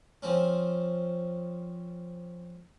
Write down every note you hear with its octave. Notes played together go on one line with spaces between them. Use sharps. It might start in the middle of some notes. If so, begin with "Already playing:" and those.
F3 C4 C#4